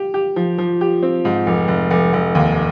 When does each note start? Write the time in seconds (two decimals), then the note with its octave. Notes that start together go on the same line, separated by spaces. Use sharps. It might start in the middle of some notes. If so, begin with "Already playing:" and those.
Already playing: G4
0.14 G4
0.36 F3
0.58 F3
0.81 G4
1.03 C4
1.25 G#2
1.47 F1
1.68 F1
1.91 F1
2.13 F1
2.35 D#2